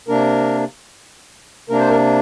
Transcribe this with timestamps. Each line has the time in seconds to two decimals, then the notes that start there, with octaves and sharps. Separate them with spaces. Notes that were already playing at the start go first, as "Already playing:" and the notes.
0.08 C3 A#3 D4 A#4
1.69 C3 A#3 D4 A#4
1.79 C5
1.90 A#4